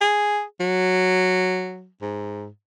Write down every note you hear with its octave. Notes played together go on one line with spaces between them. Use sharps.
G#4
F#3
G#2